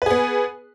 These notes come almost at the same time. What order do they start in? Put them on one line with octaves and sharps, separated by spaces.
B4 G#4 B3